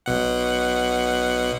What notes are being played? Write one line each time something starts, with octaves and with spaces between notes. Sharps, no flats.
B1 B2 F#5